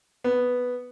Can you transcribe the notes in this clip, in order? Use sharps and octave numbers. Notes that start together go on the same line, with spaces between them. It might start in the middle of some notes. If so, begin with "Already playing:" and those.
B3